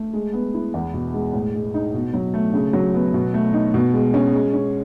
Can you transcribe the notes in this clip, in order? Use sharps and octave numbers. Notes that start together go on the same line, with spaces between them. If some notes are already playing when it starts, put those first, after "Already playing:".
Already playing: A3
G#3
B3
E4
E2
B2
G#3
A2
G#3
D#4
B2
F#3
A3
C#3
F#3
B3
B2
A3
D#4
B2
G#3
C#4
G#3
C#4